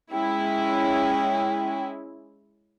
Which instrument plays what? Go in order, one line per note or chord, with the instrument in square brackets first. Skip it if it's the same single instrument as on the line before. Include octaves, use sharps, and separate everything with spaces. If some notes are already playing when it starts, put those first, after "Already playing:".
[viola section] G#3 C#4 E4 [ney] G5